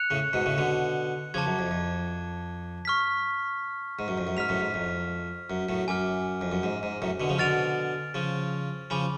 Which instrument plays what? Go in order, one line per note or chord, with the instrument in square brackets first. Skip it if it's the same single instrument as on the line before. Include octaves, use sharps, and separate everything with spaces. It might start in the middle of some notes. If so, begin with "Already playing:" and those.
Already playing: [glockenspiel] F#6 C#7 F7
[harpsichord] A2 C#3
G#2 B2
A2 C#3
B2 D3
[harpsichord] C#3 F3 [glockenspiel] A5 D6 G#6
[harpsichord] F#2
F2
F2
[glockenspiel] C#6 F6 B6
[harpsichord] G#2
F#2
F2
F#2
[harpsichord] G#2 [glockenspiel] F6 B6 F7
[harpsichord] F#2 A2
G#2
F2
F#2
F#2 A2
[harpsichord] F#2 [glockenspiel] G#5 D6 F6
[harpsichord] F2
F#2
G#2
G#2
F#2 A2
B2 D3
C#3 F3
[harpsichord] B2 D3 [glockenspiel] F6 A6 D7 F7
[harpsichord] C#3 F3
[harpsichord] C#3 F3 [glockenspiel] G#5 B5 D6